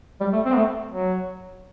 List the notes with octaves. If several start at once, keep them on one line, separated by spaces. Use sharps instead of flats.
G3
A3
C4
B3
A3
F#3